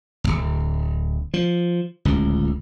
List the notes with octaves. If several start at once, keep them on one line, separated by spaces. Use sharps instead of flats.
D1 G1
F3
D1 C#2